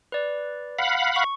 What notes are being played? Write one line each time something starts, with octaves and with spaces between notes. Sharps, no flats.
B4 D5
F5 F#5 B5
C#6